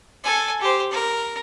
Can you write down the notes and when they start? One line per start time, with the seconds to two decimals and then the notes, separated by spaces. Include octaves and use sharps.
0.24 A4 G#5
0.61 G4 C5
0.92 A#4